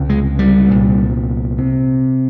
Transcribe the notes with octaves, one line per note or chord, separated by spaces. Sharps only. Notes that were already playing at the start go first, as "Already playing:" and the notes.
Already playing: C#2 C3
G#3
G3
C2 A#2
C3